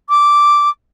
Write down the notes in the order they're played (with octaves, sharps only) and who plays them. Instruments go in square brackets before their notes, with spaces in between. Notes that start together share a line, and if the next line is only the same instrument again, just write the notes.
[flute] D6